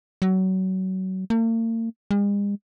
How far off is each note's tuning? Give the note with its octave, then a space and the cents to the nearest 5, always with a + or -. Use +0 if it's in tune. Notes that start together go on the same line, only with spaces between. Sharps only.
F#3 +25
A#3 -45
G#3 -45